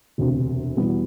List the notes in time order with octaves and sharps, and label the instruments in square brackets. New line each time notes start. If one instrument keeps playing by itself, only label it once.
[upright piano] E1 D2 C3
E2 B2 G3 B3